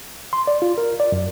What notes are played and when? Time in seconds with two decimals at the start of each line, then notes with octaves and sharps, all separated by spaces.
0.33 C6
0.47 D5
0.62 F4
0.78 A#4
1.00 D5
1.12 F#2